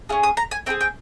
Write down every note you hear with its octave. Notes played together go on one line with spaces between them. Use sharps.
C#4 F4 G#4
D#6
A#5
G#5
C4 D#4 G#4 G5
G5